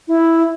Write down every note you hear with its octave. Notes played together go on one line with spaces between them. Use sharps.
E4